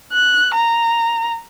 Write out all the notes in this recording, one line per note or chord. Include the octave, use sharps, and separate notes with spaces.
F#6
A#5